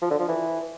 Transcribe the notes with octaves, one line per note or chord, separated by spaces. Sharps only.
F3
D3
F3
E3